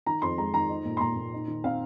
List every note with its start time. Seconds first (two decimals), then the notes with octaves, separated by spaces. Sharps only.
0.06 D#3 A#5
0.22 F2 C6
0.38 G#3 A#5
0.54 D#3 A#5
0.69 D#4
0.85 A#2
0.97 C6
1.01 A#2 A#5
1.16 A#2
1.33 D#4
1.48 D#3
1.64 C4 F5